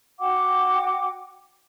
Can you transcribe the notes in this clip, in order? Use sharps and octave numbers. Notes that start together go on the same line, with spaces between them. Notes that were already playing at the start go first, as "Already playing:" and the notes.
F#4 F#5 G5 D6